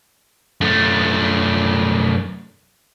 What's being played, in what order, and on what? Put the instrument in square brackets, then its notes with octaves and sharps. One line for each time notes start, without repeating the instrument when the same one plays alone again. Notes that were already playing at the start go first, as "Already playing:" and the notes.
[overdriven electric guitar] F#2 A3